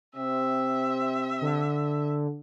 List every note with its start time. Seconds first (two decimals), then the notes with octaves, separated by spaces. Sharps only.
0.16 C3 C4 E5
1.41 D3